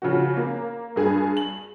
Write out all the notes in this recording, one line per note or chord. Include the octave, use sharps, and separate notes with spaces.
C#3 F3 F#4
A#3
G2 G#4 G#5
F#7